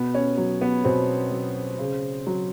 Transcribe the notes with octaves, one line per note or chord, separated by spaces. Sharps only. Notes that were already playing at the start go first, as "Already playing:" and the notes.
Already playing: B2 B3
C#4
F#3
B3
B2 C4
F#3
C#3
F#3